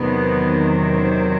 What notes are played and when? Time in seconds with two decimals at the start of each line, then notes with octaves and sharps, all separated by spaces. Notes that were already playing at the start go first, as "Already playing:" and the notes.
Already playing: E2 C3 D#3 F#3 B3
0.93 C4